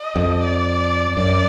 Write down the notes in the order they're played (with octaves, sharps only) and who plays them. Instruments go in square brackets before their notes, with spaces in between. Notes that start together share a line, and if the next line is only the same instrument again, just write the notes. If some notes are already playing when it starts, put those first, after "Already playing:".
Already playing: [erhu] D#5
[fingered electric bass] F2
[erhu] D5
[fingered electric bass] F#2 [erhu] D5